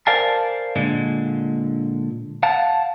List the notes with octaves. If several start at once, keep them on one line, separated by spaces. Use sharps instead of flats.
A#4 C5 D5 F5 G#5 A5
A#2 D3 G#3
F5 F#5 A5